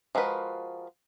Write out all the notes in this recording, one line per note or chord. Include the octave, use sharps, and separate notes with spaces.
F3 G#3 F#4 A#4 B4